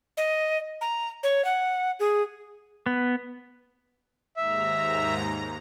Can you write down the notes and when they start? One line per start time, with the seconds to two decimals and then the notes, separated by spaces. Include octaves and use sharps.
0.17 D#5
0.81 A#5
1.23 C#5
1.45 F#5
2.00 G#4
2.86 B3
4.37 D#2 G#2 E5 A#5